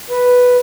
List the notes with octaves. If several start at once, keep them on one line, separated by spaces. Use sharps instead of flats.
B4